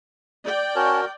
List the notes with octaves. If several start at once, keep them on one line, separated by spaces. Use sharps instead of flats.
D5 G5
C#4 F#4 A#4 C#5 A5